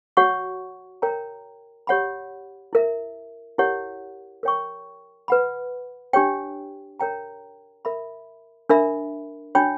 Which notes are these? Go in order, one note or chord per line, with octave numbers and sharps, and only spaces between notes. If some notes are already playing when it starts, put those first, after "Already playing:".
F#4 C#5 F#5 C#6
A#4 C#5 G5 A#5
G4 C#5 F#5 B5
E4 A#4 E5
E4 G4 A#4 C#5 F#5
A#4 C#5 G5 C#6
B4 F#5 B5
D4 G4 C#5 G5
A#4 C#5 G5 A#5
A#4 E5 B5
D4 A#4 E5 B5
D4 F#4 C#5 G5 B5